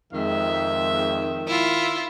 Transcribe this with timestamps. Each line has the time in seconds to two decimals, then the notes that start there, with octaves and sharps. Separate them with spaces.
0.13 F2 D#3 G#3 E5
1.48 E4 F4